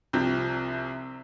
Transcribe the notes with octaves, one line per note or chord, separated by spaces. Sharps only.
C2 C3 F3 C4